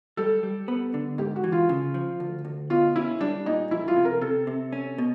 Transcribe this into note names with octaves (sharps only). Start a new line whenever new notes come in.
G3 A4
G3
B3
D3
G#2 G4
F#4
E3
F4
C#3
F3
D2
D2
B2 F4
C#4 E4
G3 D4
A#2 D#4
F2 E4
F4
C3
A#4
C3 A4
C3
C#4
B2